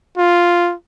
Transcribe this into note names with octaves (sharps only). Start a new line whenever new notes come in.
F4